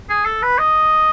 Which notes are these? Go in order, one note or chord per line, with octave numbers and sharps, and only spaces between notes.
G#4
A4
B4
D#5